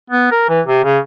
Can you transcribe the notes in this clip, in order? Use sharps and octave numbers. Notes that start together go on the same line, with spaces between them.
B3
A#4
E3
C3
C#3